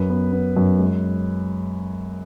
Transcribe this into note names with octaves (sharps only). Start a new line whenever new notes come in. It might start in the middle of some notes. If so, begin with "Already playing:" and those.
Already playing: F#2 B4
B3
B3
F#2
G#3